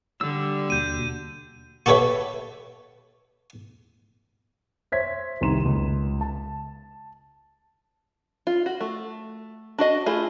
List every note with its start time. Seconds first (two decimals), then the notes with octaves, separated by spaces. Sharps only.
0.21 D3 G3 E6
0.70 D#2 B2 G6 D#7
1.86 F#4 G4 A4 B4 C#5 E5
4.92 C5 C#5 E5 G#6 B6
5.41 C2 C3 D#3 A#5 C6 E7
5.65 C#2
6.21 A5
8.47 F4
8.66 F#4
8.81 A3
9.79 D4 F#4 D#5
10.06 A3 E4 F4 G#4